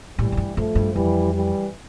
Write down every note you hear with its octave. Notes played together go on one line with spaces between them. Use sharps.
A2 E3 G3
A2
G2
G2 F3 A3
G2
F2 E3 G3
E3 G3